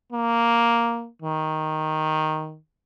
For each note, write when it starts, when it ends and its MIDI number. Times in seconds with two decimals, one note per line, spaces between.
0.12 1.08 58
1.22 2.58 51